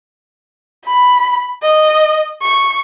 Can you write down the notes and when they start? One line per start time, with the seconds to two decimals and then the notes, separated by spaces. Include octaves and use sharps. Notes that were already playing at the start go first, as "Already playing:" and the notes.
0.84 B5
1.62 D#5
2.42 C#6